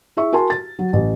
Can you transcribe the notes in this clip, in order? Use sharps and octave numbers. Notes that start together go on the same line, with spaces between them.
E4 G#4 E5 C#6
F#4 A#4 G#5 A5 C6
A6
F#3
A1